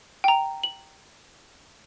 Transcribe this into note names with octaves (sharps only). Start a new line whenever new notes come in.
G5 A#5
F#7